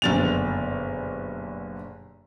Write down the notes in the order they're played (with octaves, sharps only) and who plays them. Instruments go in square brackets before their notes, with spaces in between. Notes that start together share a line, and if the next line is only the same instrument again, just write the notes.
[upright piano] F#1 A6 F7 [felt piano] G2 B2 D3